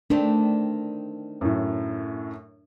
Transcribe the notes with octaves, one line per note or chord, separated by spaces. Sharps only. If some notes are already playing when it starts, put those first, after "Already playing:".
D#3 A3 C4 D4
F#2 A2